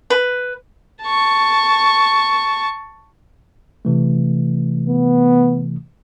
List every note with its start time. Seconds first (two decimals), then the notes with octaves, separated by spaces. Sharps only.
0.10 B4
1.03 A5 C#6
3.85 C3 E3 A3
4.89 B3